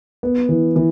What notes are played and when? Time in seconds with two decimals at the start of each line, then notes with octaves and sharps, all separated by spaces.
0.23 B3
0.49 E3
0.76 E3